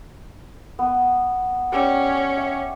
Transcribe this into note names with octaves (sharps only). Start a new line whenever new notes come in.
B3
C#4 G4 D5
E5